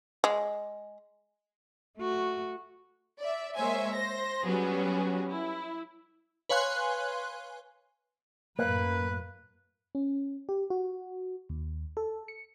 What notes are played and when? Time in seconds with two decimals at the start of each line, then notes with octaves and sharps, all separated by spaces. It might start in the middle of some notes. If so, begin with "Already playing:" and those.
0.24 G#3
1.97 A3 F#4
3.20 D5 E5
3.55 G#3 A#3 C5 C#5 E5 G#5
3.93 C5 A#6
4.44 F#3 G3 B3 C#4 F#4 G#4
5.29 E4
6.49 B4 C#5 F5 G#5 C6 F#6
8.59 F#2 A2 A#3 B4 F#6
9.95 C#4
10.49 G4
10.70 F#4
11.49 D#2
11.97 A4
12.28 C#7